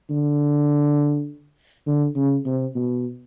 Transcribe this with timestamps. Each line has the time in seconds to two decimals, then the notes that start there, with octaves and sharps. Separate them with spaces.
0.10 D3
1.87 D3
2.16 C#3
2.46 C3
2.75 B2